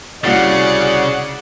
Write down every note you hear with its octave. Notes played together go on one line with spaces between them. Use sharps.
C2 C#3 F#4 G#4 D5 F#5 A6